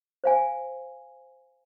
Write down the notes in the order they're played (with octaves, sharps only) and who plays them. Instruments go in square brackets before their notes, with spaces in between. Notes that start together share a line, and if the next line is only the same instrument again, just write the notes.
[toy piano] C5 F5 G#5